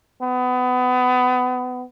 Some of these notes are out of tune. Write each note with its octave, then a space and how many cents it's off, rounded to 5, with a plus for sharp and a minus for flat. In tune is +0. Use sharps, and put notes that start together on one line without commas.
B3 +25